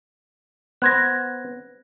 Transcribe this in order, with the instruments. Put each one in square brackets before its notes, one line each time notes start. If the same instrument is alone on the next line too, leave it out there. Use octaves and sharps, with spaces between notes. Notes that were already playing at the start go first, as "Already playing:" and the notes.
[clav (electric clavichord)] B3 C5 [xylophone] F#6 G#6 A#6